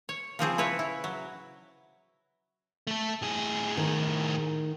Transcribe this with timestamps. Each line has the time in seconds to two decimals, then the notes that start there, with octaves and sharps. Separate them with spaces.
0.09 C#5
0.39 C#3 F3 C4 G#4
0.58 E4 B4 C#5
0.79 E4
1.04 F#3
2.87 A3 A4
3.22 A2 G#4
3.77 D#3